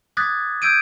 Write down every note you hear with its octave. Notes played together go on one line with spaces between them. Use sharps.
D6 D#6 F#6 G#6 A6 B6
E6 G6 G#6 D7 D#7